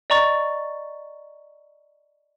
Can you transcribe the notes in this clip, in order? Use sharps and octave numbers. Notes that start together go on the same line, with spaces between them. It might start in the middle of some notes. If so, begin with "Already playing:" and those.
D5 D#5 A#5 C#6 A6